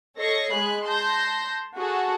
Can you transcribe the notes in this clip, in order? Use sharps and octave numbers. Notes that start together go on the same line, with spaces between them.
A4 C#5 D#5 C#6 A#6 C7
G#3 G#5 B5 F#6
A5 C6 G6 A#6
F#4 G#4 A4 F#5 A5